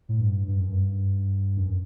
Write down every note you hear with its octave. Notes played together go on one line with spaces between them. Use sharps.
A2
G2
G2
F#2
G2
F#2